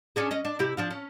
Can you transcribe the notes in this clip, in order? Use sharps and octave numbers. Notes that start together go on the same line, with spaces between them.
C#4 D4 G#4
C#4 D#5
D4
C3 E4 G4
F3 D4 F4
C#4